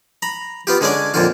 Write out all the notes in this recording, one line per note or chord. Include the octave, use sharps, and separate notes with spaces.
A#5 B5
B3 F4 G4
D3 G#3 C#4 D4 D5
F2 A#2 D3 F4